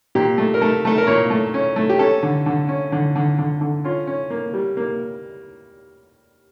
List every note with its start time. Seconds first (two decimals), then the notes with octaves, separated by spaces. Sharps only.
0.15 A#2 G4
0.38 A3
0.54 A#4
0.61 A3 A4
0.85 A3 A4
0.98 A#4
1.07 A#2 C#5
1.30 A3
1.54 C#4
1.76 A3
1.89 G4
1.99 C#4 A4
2.23 D3
2.46 D3
2.69 C#4
2.92 D3
3.16 D3
3.38 D3
3.61 D3
3.84 C#4 F4
4.07 C#4
4.30 A#3
4.54 G3
4.77 A#3